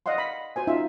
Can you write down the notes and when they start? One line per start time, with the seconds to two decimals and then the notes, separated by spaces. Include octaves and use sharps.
0.06 D5 D#5 F5 F#5 C6
0.18 B5
0.56 F#4 C5 G#5
0.67 C#4 D#4 F4 E5